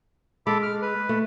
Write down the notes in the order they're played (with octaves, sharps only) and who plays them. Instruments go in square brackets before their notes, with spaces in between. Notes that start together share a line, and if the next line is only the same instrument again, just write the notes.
[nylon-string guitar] G#3 [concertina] A4 B5 D6
[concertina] F6
B4
[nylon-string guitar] A3